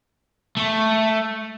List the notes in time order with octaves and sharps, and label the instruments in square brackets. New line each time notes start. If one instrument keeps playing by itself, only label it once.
[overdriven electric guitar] A3